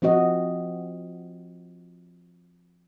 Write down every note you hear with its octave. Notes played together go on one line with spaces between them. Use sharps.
F3 C4 F#4 D#5